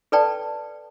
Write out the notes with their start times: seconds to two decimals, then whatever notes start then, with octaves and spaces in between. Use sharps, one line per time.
0.12 A4 B4 D5 G5 A5